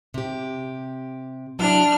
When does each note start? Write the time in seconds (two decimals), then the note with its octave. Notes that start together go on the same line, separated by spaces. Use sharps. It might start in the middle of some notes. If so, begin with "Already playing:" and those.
0.14 C3 G4
1.59 F#3 D4 E4 F6